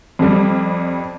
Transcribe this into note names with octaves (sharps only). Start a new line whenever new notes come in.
F2 G3